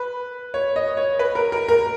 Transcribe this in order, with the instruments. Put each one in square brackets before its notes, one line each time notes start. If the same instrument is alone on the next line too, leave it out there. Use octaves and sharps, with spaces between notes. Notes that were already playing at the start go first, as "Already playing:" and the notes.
Already playing: [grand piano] B4
C#5
D#5
C#5
B4
A#4
A#4
A#4